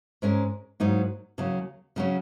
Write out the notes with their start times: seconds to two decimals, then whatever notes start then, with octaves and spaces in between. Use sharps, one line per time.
0.22 G#2 G#3 C#4 A#4
0.80 G#2 F#3 A#3 D#4
1.38 D#2 C#3 F#3 C#4
1.96 C#3 F#3 C#4